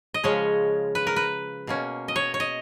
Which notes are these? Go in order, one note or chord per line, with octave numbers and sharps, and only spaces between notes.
D#5
C#3 F3 G#3 C#4 C#5
B4
A#4
B4
B2 A#3 C#4
D#5
C#5
C#5
D#5